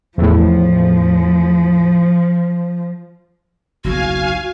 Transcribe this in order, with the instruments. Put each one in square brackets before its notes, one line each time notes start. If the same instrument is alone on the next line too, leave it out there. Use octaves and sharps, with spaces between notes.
[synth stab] E2 A2 [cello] F3
[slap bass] F#1 B1 E2 [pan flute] F#4 [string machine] F5 G#5